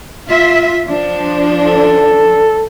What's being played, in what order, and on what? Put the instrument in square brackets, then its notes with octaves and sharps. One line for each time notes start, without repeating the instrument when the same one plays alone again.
[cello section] F4 E5
F3 D4
[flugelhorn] A4